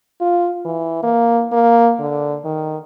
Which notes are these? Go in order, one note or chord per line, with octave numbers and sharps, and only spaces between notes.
F4
E3
A#3
A#3
D3
D#3